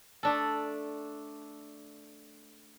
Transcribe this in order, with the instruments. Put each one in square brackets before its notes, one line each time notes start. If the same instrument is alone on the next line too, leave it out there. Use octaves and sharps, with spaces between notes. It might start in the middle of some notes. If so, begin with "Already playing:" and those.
[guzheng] A3 D4 A4